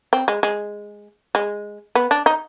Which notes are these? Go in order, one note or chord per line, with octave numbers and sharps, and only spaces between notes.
C4
G#3
G#3
G#3
B3
D4
D#4